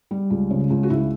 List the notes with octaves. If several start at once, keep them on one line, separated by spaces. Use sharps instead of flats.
G3
C#2
C#3
C#2
F#4
C#2 E4